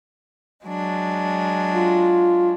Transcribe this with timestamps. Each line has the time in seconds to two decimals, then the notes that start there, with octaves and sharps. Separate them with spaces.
0.66 F#3 G#3 D4
1.74 F4